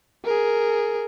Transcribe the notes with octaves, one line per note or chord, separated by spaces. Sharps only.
G#4 A#4